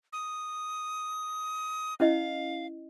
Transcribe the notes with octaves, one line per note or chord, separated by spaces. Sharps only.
D#6
C#4 E4 D#5 F5